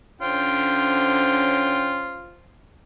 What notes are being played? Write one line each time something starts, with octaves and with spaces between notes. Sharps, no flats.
D3 C#4 F4 C5 G5